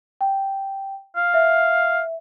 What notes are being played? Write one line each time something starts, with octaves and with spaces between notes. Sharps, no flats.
G5
F5
E5